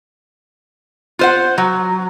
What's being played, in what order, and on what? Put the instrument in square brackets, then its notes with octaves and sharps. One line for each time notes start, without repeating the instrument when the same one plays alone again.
[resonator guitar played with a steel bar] F4 C5 F#5
F#3